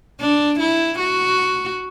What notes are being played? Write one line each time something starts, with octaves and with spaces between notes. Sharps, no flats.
D4
E4
F#4